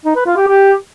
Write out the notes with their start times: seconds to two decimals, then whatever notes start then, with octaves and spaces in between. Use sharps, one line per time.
0.05 D#4
0.15 B4
0.26 F4
0.37 G4
0.47 G4